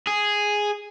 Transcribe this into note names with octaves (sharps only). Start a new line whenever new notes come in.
G#4